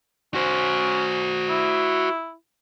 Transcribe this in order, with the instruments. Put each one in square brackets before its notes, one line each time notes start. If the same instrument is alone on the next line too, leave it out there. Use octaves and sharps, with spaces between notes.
[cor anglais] C#4 [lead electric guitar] F#4 C5
[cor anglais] E4